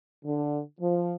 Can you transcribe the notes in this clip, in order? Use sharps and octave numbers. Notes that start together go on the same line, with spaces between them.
D3
F3